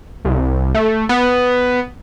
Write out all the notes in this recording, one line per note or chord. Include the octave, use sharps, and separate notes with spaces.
C2
A3
B3